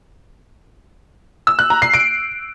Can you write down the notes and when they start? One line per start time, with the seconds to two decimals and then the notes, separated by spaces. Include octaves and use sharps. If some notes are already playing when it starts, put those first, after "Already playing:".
1.47 E6
1.59 F#6
1.70 A#5
1.82 C7
1.94 D7